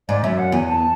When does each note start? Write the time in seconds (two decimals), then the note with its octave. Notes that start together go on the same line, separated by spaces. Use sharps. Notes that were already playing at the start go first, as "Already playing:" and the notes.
0.09 G#2 D5
0.23 F#2 E5
0.38 F#5
0.52 E2 G#5
0.68 A5